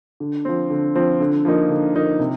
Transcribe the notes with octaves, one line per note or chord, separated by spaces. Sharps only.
D3
F3 C4
D3
F3 C4
D3
F3 A#3 D#4
D3
F3 A#3 D#4
C3